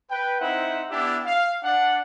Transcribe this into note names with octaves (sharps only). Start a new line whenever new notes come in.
B4 G5
C4 D#4 E4 C5 E5 F#5
B3 D4 E4 G4 E5
F5
D4 F#5